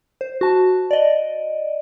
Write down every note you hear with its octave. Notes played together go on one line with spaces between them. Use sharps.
C5
F#4 A5
D5 D#5